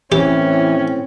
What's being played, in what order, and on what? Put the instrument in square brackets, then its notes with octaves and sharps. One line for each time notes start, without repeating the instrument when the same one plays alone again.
[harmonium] A2 C4 [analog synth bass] E3 [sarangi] C#4 [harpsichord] G4